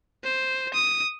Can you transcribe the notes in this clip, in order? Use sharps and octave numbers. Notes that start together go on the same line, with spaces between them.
C5
D#6